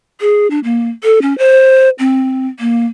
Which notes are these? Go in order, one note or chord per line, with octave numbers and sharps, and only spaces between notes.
G#4
D4
A#3
A4
C#4
C5
C4
A#3